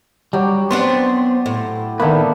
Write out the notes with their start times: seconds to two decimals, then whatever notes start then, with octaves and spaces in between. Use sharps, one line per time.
0.33 F#3 G3 G4
0.71 B3 C4 D4 C5
1.46 A2
2.00 D#3 A#3 B3 D4 E4 B4